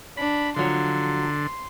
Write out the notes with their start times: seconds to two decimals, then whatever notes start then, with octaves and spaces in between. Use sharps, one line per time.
0.17 D4 B5
0.56 D3 F3 F#3 C6